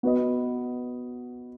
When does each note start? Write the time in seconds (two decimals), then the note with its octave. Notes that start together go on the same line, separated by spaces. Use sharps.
0.03 B3 F#4 B4 D#5